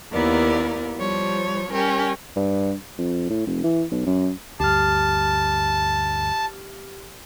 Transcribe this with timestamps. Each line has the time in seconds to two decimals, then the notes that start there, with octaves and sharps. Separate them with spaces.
0.12 D#2 A#3 B3 E4 A#4 D5
0.97 F3 G3 C#5
1.71 G3 C#4 G4 A#4
2.36 G2
2.98 F2
3.30 A2
3.46 F1
3.64 E3
3.91 B1
4.06 F#2
4.60 D2 G2 G4 A5 F6